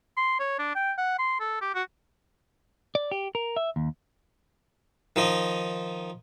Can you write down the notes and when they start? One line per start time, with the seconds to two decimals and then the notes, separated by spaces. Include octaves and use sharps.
0.17 C6
0.40 C#5
0.58 D4
0.75 G5
0.98 F#5
1.18 C6
1.40 A4
1.61 G4
1.75 F#4
2.95 D5
3.11 G4
3.35 A#4
3.56 E5
3.76 D#2
5.16 D#3 F3 D#4